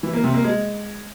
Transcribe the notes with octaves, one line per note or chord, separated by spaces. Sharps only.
E3
A#3
C3
A#3
G#3